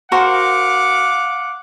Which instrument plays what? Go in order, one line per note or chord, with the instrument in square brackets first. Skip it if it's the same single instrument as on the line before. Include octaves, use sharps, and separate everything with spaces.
[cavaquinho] F#4 A#4 C5 [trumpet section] F5 F#5 D6